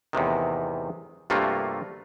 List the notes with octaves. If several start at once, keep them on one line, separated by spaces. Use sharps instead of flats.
E2 A2 C3 D#3
G2 C3 A3 A#3 F4 F#4